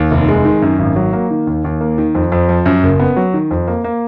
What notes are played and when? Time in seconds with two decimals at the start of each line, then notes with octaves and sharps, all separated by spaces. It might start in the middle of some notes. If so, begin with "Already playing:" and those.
Already playing: D#2
0.11 F1
0.28 G#3
0.45 D#3
0.62 F#2
0.79 G#1
0.96 F#3
1.13 A#3
1.31 D#3
1.47 D#2
1.64 D#2
1.81 A#3
1.98 D#3
2.15 F2
2.32 F2
2.49 F3
2.66 F#2
2.83 F#1
3.00 B3
3.16 F#3
3.34 D#3
3.51 F2
3.67 A#3
3.84 A#3